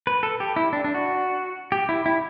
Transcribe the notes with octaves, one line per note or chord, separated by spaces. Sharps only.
B4
A4
G4
E4
D4
D4
F#4
G4
E4
E4